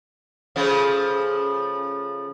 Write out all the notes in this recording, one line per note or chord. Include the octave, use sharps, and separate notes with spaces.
C#3 F3 A3